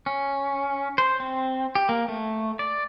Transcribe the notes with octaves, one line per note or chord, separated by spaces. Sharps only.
C#4
C5
C4
G4
A#3
A3
D5